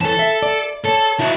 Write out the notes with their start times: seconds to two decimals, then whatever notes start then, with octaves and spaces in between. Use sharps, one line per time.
0.01 F2 E3 C#4 A4 A5
0.19 E5
0.42 D5
0.85 A4 C#5 A5
1.20 E4 F#4